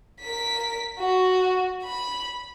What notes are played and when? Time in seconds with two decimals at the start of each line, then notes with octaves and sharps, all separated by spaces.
0.21 A#4 B6
0.99 F#4
1.83 B5